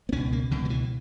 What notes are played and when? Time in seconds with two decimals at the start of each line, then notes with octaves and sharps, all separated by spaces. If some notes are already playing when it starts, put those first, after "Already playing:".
0.09 B3
0.12 C#2 C#4
0.16 B2
0.32 A#3
0.51 C#2 B2 D3
0.65 F#3
0.70 E3